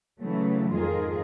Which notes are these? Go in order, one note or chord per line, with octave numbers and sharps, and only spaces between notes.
C#3 E3 F#3 A3
F2 G#2 D#3 F4 G#4 A#4